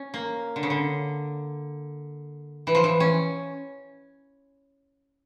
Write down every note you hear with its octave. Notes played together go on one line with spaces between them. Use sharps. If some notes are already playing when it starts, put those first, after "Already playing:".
Already playing: C#4
A#3
D3
C#3
D3
E3
F3
E3
C#4